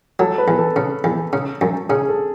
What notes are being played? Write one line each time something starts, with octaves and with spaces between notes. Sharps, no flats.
F#3 A4
B4
E2
A4
C#3
E2
C#3
F#2
C#3 G#4
A4